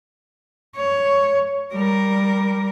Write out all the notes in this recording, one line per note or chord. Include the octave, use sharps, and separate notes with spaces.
C#5
G3 A#4